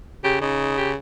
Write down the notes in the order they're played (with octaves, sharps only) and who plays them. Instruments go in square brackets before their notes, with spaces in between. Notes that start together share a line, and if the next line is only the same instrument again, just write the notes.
[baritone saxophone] C#3 [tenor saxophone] G4
[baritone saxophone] C#3 [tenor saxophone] D#4
[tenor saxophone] G4